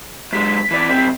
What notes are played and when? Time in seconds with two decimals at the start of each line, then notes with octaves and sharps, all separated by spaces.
0.33 F#2 G#3 B6
0.71 E3 D5
0.89 B1 C4